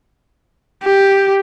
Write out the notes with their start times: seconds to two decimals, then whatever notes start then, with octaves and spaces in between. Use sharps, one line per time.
0.83 G4